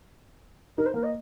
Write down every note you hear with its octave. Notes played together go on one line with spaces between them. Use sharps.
D#4 A#4
C5
A#3 A#4
D#5